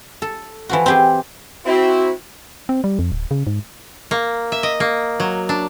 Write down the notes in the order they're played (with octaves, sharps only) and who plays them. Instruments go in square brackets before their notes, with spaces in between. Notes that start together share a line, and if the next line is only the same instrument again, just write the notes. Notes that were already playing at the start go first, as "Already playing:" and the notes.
[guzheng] A4
E3 F3 F#4
C4 G4 G#4
[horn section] C4 E4 [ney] F#4
[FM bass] C4
G3
F2
D1
C#3
G#2
[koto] A#3
E5
D#5
A#3
F#3
D4